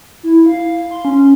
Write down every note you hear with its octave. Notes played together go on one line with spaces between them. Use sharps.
E4
F5
C6
C#4